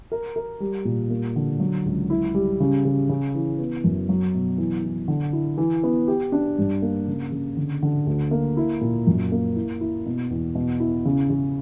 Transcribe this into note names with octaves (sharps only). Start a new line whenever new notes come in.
A#4
A#4
G3
A#2
A#3
D3
F#3
C#2
E4
G3
C#3
C#3
C#3
E3
B3
F#2
F#3
B2
E3
E3
D3
E4
E3
B3
G4
D4
G2
A#3
C#3
C#3
D3
D3
D2
A#3
E4
A#2
F#2
A#3
E4
E4
B2
E2
B2
E4
C#3
C#3